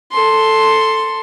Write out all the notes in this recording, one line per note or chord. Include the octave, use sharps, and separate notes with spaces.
A4 C6